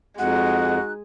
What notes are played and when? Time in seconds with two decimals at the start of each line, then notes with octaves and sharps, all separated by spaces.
0.18 F2 G#3 D#4 F#4 F#5 F#6